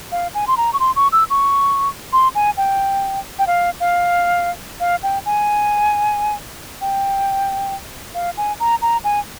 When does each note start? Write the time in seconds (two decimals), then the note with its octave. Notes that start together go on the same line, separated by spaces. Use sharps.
0.12 F5
0.34 G#5
0.47 C6
0.57 A#5
0.73 C#6
0.80 C6
0.96 C#6
1.12 E6
1.30 C#6
2.13 C6
2.35 G#5
2.57 G5
3.39 G5
3.47 F5
3.80 F5
4.80 F5
5.03 G5
5.26 G#5
6.81 G5
8.15 F5
8.37 G#5
8.60 A#5
8.82 A#5
9.04 G#5